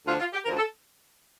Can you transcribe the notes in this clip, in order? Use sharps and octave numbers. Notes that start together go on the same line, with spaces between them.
D2 D3 F3 F4
F4
G4
D2 D3 F3 A#4
A4